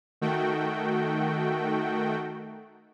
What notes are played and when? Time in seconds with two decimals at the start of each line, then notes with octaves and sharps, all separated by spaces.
0.21 D#3 A3 F#4 G5